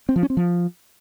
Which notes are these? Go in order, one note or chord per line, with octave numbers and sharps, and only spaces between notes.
C4
F3
C#4
C4
F3